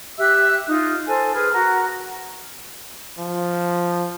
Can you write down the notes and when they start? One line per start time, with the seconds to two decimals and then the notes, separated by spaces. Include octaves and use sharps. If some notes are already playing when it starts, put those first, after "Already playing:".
0.18 G4 E5 E6 F#6
0.67 D#4 F4
1.06 A4 C5 G#5
1.33 G#4 B4 F6
1.52 F#4 A#4 F#5
3.19 F3